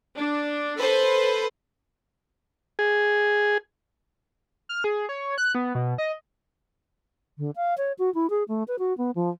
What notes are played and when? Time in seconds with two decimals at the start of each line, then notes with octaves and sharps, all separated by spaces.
0.17 D4
0.79 A4 B4 C5
2.79 G#4
4.69 F6
4.84 G#4
5.09 C#5
5.38 F#6
5.55 B3
5.75 B2
5.98 D#5
7.38 D3
7.56 F5
7.78 C#5
7.98 F#4
8.14 E4
8.30 G#4
8.48 A3
8.68 B4
8.79 F#4
8.98 B3
9.15 F3